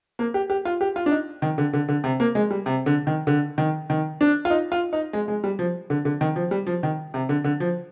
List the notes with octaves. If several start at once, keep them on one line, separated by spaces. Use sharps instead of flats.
A#3
G4
G4
F4
G4
F4
D4
D#4
D#3
D3
D3
D3
C3
A#3
G#3
G3
C3
D3
D#3
D3
D#3
D#3
D4
F4
D#4
F4
D#4
G#3
G#3
G3
F3
D3
D3
D#3
F3
G3
F3
D#3
C3
D3
D3
F3